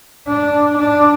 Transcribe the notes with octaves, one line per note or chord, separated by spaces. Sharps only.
D4
D4